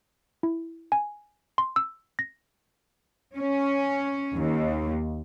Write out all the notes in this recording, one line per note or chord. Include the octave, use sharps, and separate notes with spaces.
E4
G#5
C6
E6
A#6
C#4
D#2